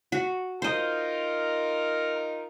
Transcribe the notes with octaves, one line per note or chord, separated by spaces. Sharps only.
F#4
D#4 F4 A#4 C5 D#5